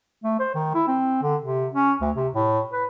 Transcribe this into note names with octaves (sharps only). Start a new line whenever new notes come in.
A3
C5
D#3
E4
C4
D3
C3
C#4
D2
C3
A2
B4